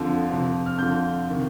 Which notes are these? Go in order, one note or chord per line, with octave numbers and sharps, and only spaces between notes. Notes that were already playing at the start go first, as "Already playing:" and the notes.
Already playing: F2 D3 F3
F2 C3 F3
F6
F2 D3 F3 G6
C3 D#3